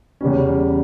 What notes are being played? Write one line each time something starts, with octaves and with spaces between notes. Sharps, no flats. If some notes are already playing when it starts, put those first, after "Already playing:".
E2 C#3 G3 C#4